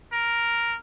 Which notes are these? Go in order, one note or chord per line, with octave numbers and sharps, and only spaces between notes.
A#4